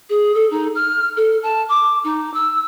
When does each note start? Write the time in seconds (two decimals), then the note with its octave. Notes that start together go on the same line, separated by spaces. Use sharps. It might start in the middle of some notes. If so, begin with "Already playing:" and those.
0.10 G#4
0.35 A4
0.51 D#4
0.75 F6
1.17 A4
1.43 A5
1.69 D6
2.04 D#4
2.34 E6